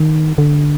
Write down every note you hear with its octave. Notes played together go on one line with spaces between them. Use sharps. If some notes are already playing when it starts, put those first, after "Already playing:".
Already playing: D#3
D3